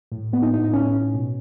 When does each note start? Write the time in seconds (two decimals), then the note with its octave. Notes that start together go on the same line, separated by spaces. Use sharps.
0.12 A2
0.32 A2 B3
0.42 D#4
0.53 A2 D#4
0.64 D#4
0.73 A2 C#4
0.93 A2
1.14 B2